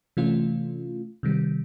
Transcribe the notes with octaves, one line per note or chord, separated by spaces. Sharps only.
C3 E3 A3 C#4 F4
C3 D#3 G3